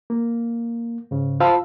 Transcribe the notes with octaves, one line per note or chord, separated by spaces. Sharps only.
A#3
G#2 C#3
F4 C5 F5 A5 B5 E6